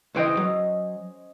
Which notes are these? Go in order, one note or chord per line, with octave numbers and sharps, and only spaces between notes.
C#2 E3 C#4 C5 D#5 G5
F#3